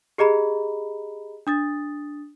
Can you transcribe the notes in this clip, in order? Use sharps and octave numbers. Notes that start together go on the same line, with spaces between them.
G4 G#4 D#5 A#5 B5
D4 D#6 A6